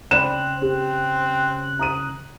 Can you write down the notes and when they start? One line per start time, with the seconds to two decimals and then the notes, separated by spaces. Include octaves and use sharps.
0.11 C#3 C4 C5 D5 B5 F#6 E7
0.62 C4 G4
1.79 A#5 D#6 D#7